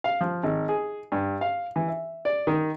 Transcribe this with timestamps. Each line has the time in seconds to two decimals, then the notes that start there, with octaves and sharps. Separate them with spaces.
0.04 F5
0.21 F3
0.43 G#1
0.69 G#4
1.12 G2
1.41 F5
1.76 E3
1.88 E5
2.25 D5
2.47 D#3